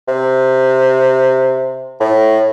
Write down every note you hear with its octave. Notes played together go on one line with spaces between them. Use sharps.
C3
A2